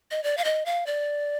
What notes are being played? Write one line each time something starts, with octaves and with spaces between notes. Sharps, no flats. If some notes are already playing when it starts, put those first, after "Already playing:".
D#5
D5
F5
D#5
F5
D5